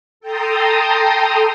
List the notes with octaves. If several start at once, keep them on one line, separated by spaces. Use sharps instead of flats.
A4 G5 A5 A#5 C6 D#6